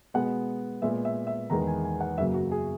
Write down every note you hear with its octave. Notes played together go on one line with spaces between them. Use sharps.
B2 G#3 B3 F#5
A#2 G#3 B3 E5
E5
E5
E2 D#3 G#3 B3 A#5
G#5
G#5
F#5
F#2 C#3 F#3 A#3 E5
F#4
G#4